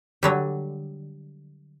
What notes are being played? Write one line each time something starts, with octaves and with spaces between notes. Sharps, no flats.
D3 F#3 G3